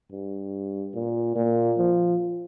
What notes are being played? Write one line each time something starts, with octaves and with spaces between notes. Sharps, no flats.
G2
A#2
A#2
F3